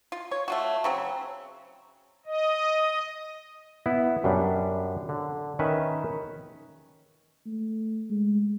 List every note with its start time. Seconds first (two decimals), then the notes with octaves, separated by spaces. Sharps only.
0.12 F4
0.31 C#5
0.48 A3 F4 F#4
0.84 C#3 F#3 C4
2.26 D#5
3.86 B3 E4
4.24 F#2 G3 D4
5.09 D3
5.59 D#3 C#4 B4 E5
7.46 A3
8.10 G#3